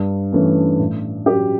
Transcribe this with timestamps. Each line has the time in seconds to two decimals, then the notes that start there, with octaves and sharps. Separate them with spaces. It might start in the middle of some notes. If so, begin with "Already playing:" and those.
Already playing: G2
0.32 E3 A3 C#4
0.79 A2
1.26 F#3 C#4 G4